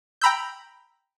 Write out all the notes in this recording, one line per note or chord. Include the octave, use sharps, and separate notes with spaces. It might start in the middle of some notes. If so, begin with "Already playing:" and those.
G5 A#5 B5 E6 G6